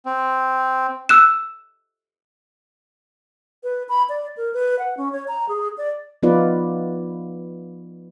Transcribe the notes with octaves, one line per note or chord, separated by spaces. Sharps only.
C4
E6 F#6 E7
B4
B5
D5
A#4
B4
F#5
C#4
C#5
A#5
G#4
D5
F3 B3 D#4 F4 B4 D5